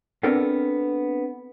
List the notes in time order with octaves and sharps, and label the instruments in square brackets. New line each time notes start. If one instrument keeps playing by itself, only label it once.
[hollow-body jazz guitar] B3 C4 D4 A4 A#4